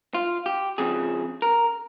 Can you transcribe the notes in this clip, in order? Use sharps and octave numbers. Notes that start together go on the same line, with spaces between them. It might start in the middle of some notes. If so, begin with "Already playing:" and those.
F4
G4
F2 C#3 F3 G#4
A#4